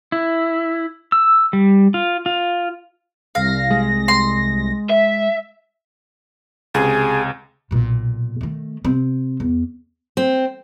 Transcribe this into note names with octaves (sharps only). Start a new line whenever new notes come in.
E4
E6
G3
F4
F4
C2 F5 A#6
G#3
C6
E5
C#2 C3 G#4
B1 A#2
D#3 A3
C3 C4
E2
C4